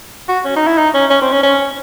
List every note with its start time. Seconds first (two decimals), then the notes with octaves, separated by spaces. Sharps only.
0.28 F#4
0.45 C#4
0.56 D#4
0.67 E4
0.78 D#4
0.94 C#4
1.10 C#4
1.22 C4
1.32 C#4
1.43 C#4